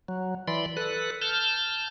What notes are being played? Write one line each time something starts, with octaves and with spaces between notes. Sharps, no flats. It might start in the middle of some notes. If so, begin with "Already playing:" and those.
F#3
E3 D5 B5 C6
A4 B4 F#6
A5 F6 G6